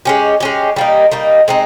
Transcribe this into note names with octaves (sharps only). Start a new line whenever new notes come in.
G#3 C#4 G4
G#3 C#4 G4
G3 A#3 D#4
G3 A#3 D#4
G#3 C4 D#4